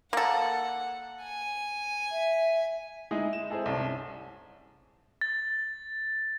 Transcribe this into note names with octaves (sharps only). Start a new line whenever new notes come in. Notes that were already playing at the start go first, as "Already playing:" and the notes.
A#3 A4 F#5
G#5
E5
G#3 D#4 E4 G#4
E7
C4 E4 G#4 A4
C2 C#4 A5
A6